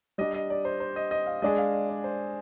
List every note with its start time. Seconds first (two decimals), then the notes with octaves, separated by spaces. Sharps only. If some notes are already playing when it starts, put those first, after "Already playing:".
0.18 G3 D4 G4 D#5
0.34 D#5
0.50 D5
0.65 C5
0.80 C5
0.96 D#5
1.11 D#5
1.27 F5
1.42 G#3 D4 G#4 D#5
1.58 F5
1.73 D#5
1.89 D5
2.04 C5